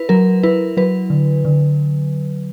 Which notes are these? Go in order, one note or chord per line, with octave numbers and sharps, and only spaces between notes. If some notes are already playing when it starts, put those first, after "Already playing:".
Already playing: E4 B4
F#3 A#4
E4 B4
F#3 B4
D3
D3